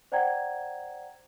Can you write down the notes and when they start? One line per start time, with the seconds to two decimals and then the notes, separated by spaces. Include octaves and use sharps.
0.12 C5 D5 F#5 G5 A#5 G#6